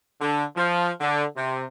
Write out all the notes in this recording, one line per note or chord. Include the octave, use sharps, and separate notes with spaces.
D3
F3
D3
C3